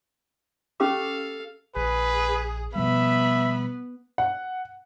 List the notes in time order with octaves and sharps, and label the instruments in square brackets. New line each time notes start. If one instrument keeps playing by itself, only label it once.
[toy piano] C#4 G4 D6 [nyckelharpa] A4 F5
[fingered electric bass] A#1 [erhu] G#4 [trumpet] B4
[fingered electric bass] B2 F3 G3 [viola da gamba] B3 [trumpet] E5 [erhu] B5
[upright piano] F#5